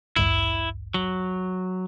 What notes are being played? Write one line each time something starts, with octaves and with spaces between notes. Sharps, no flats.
A1 D2 G2 E4
F#3